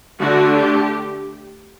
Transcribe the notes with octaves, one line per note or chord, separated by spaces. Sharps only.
D3 A3 D4 F#4
G4